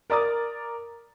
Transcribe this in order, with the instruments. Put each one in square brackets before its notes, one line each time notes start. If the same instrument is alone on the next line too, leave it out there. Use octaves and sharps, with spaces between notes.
[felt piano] A#4 D5 A#5 D6 D#6 A6